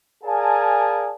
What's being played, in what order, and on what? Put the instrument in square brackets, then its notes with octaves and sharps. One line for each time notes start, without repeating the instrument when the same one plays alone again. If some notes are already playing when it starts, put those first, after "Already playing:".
[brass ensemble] G#4 A#4 D5 F5 G#5 A5